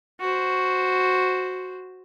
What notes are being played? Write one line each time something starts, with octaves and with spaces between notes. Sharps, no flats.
F#4 C5